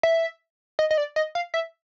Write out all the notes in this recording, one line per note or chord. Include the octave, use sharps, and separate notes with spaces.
E5
D#5
D#5
D5
D#5
F5
E5